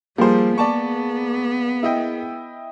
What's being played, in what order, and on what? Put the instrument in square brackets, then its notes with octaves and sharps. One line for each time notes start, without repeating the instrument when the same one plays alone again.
[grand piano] F3 C5 [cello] G3 [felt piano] A#3 G#4
[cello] B3 [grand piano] D5 A5 C#6
[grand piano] E4 D#5 G5